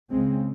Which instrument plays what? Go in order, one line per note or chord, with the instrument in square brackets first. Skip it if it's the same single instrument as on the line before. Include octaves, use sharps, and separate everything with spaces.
[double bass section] C#2 C#3 G#3 C4